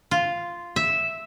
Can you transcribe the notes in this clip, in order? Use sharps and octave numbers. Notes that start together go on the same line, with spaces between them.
F4
E5